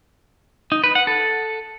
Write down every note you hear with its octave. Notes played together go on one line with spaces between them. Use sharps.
D#4
B4
F#5
A4